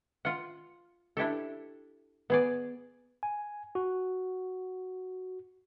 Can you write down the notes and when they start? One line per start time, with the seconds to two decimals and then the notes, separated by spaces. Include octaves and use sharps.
0.25 F4 F#5
1.17 D4 E4 G4 A4
2.30 B3 G#4 D5
3.23 G#5
3.75 F#4